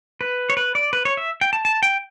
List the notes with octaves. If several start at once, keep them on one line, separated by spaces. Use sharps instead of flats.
B4
C#5
B4
D5
B4
C#5
E5
G5
A5
A5
G5